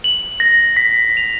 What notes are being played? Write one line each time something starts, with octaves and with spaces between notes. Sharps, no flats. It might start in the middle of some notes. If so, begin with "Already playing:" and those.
F#7
A#6
B6
F7